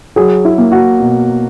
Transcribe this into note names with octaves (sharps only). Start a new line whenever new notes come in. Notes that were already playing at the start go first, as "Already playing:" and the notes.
F#3 G#4
E4
A#3
F#4
B2